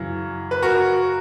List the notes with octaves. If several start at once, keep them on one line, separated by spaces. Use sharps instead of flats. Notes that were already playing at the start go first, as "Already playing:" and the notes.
Already playing: F#2 C#3 E3
B4
F#4 A#4